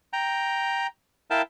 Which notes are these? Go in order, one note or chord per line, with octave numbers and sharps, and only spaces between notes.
G5 A#5
E4 A#4 F5 G5 A5